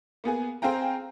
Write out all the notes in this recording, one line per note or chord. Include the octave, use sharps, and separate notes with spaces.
A#3 B3 G#4 G#5
C4 G#4 F5 G5 A#5